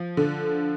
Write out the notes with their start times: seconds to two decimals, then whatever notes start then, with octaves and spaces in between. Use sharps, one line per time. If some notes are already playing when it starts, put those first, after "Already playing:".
Already playing: F3
0.17 D3